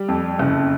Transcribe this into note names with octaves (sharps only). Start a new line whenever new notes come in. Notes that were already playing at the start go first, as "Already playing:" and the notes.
Already playing: G3
F2
F#1